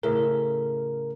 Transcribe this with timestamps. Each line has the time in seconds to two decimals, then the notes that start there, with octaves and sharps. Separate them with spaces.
0.03 A2 C#3 A#4 E5